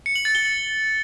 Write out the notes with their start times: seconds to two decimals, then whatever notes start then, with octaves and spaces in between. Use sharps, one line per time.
0.06 C#7
0.16 F#7
0.25 A6
0.35 G7